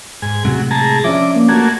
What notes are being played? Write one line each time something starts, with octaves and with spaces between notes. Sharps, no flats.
G#2 G#5
A2 C3 F#3 G#3
G#4 A5 A#5
F3 C#4 D4 E5 D6
A#3
A3 A#3 F#4 G#6